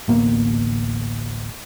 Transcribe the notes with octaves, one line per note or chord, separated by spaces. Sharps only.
A1 D2 A#3 B3